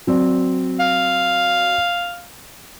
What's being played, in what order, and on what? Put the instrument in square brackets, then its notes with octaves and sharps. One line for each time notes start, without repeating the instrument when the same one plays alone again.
[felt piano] F#3 C4 D5
[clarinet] F5